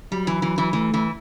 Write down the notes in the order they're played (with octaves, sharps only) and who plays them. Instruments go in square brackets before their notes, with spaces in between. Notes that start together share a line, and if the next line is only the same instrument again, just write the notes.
[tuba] F#3 [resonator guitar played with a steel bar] G3
[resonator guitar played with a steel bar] E3
E3
E3
[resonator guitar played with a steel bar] E3 [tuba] A3
[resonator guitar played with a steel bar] E3